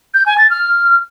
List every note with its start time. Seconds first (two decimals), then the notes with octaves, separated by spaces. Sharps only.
0.14 G6
0.26 G#5
0.38 A6
0.50 F6